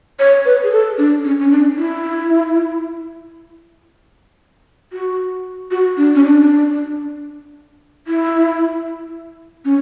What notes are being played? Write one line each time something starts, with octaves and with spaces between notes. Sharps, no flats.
C#5
B4
G#4
A4
D4
C#4
C#4
D4
E4
F#4
F#4
D4
C#4
D4
E4
C#4